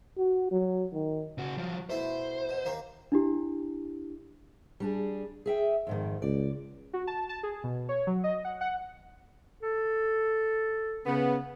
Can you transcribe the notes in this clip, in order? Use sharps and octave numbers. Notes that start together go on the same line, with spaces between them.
F#4
F#3
D#3
C#3 F#4
F3 F#3
B2 A3 E4 C5
B2
D#2 A#3 C4
D4 E4 G4
G3 D4 G#4
G#4 E5 G5
F2 G#2 D#3
C#2 D5
F#4
A5
A5
G#4
B2
C#5
F#3
D#5
F#5
F#5
A4
C#3 B3